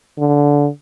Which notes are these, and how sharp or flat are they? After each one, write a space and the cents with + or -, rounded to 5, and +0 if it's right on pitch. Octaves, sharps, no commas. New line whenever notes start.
D3 -20